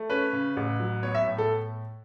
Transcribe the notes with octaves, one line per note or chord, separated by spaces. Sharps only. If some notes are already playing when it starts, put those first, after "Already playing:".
Already playing: A3
C#4 B4
C#3
A1
F#3
B3 C#5
E5
A2
A4